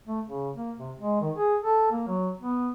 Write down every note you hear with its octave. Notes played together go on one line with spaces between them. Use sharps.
A3
C#3
A#3
C3
G#3
D#3
G#4
A4
A#3
F#3
B3